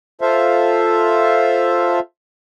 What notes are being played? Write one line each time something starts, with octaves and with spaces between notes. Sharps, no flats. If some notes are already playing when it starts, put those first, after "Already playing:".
F4 A4 C5 E5 F5